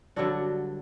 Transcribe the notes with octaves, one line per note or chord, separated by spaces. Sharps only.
G2 D3 F#3 D4 F#4